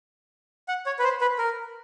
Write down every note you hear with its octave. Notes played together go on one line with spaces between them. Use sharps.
F#5
C#5
B4
C5
B4
A#4